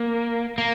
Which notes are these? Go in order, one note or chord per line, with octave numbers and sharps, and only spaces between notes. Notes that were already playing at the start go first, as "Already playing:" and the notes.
Already playing: A#3
A#3